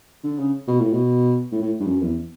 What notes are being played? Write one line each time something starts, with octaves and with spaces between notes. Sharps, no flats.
D3
C#3
B2
A2
B2
A2
A2
G2
F#2
E2